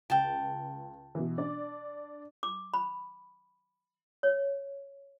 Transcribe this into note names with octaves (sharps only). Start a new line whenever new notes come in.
C#2 G5 A5
B2 E3
D4 D5
D6
B5
C#5